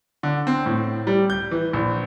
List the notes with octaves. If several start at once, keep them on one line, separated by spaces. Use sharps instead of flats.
D3
C4
A2
G3
G6
E3
A#1